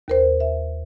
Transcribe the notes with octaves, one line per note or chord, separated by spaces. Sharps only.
D#2 A#4 C5
E5